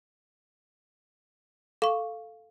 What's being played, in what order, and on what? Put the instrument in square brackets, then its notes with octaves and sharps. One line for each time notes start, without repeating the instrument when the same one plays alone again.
[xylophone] A4 C#6 [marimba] F5